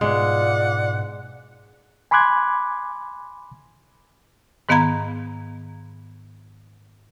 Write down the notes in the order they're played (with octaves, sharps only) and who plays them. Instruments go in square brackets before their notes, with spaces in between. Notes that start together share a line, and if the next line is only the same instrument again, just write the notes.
[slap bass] G#2 B2 [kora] G#3 [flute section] F4 D5 D6 [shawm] F#5
[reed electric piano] G#5 B5 C6 D6 F#6 G#6
[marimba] G#2 D#3 B3 F5 A#5 G#6